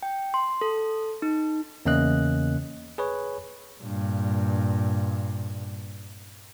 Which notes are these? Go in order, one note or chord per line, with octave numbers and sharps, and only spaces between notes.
G5
C6
A4
D#4
E2 C#3 A#3 C#4 D#5 F#6
G#4 B4 C#5
G2 A#2